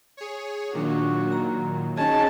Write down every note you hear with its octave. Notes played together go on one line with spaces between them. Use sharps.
G#4 C#5
A#2 D#3 F#3 D4 F#4 C#6
A#5
C#4 D#4 F#4 G#4 D#5 G#5 A5